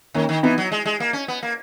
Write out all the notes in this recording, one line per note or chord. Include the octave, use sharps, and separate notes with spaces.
D#3 A#3 C#4
D#3
E3 B3 D#4
F#3
G#3
G#3
A#3
C#4
B3
A#3